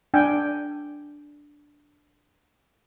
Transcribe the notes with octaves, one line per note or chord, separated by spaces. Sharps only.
D4 G5 G#5